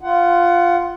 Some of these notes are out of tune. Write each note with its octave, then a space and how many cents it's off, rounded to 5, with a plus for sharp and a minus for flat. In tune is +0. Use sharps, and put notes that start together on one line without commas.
F4 -5 F#5 +20